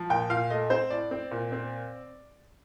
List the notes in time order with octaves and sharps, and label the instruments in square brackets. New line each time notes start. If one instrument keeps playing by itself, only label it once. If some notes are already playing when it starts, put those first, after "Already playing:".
Already playing: [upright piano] F3
A#2 G5
A#2 F5
A3 D#5
C4 C5
A2 D5
C4
A#2
C4